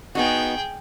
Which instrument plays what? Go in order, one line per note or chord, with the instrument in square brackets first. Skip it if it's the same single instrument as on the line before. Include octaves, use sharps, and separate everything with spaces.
[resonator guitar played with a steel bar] B3 D#4 F#4 [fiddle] G#4 G5